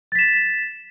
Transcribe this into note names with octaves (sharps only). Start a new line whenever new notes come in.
A6 B6 E7